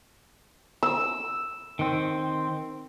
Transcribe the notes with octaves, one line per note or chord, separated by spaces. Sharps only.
E6
D#3 C4